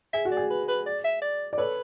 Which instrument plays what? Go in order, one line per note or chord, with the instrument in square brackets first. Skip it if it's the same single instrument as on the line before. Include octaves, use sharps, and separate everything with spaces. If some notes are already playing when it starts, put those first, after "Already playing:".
[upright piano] G#4 [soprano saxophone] E5
[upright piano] F#4
[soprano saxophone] D5
[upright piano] G#4
[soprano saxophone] B4
B4
D5
E5
D5
[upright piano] D5
[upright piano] A4 C#5 [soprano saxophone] B4